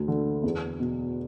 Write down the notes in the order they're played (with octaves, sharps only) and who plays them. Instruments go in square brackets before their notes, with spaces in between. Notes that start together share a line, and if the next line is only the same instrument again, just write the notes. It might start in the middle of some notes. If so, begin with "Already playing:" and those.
Already playing: [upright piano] D2
D3
E2
B2